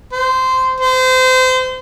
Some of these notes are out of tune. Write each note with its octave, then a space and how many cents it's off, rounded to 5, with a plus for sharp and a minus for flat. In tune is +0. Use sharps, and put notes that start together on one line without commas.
C5 -15
C5 -30